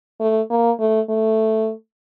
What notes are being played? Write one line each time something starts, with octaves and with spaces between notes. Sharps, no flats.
A3
A#3
A3
A3